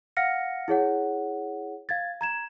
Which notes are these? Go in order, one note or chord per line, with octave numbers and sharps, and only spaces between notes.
F5 F#5 F6 A#6 C#7
E4 G#4 C#5 F#5
F5 G#6 A6
A#5 G#6 E7